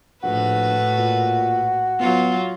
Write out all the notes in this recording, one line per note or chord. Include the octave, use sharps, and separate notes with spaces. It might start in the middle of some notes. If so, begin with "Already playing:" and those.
A#1 A2 F#4 B4
A#2
F#3 B3 F4